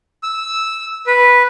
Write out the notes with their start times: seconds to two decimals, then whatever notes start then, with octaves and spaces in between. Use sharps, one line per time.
0.23 E6
1.07 B4